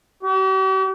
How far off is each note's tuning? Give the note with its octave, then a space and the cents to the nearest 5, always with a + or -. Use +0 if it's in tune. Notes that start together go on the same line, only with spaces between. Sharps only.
G4 -45